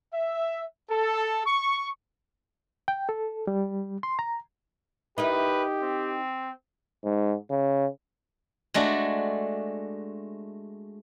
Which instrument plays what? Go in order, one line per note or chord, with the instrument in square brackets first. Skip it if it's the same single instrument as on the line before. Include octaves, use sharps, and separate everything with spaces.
[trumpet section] E5
A4
C#6
[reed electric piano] G5
A4
G3
C6
A#5
[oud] D#4 E4 A#4 [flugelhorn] G4 [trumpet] B4
[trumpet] C4
[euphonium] G#2
C#3
[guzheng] G#3 A3 D4 F#4